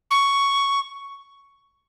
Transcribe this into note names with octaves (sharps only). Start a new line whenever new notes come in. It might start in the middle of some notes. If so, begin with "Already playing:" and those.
C#6